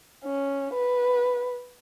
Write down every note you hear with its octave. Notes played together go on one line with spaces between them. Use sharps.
C#4
B4